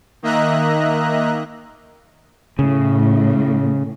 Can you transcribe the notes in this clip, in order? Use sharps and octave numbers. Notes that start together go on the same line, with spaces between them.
D#3 A#3 D#5 E5 A#5 F#6
A2 C#3